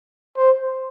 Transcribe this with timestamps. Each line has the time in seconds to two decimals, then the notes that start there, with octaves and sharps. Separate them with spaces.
0.37 C5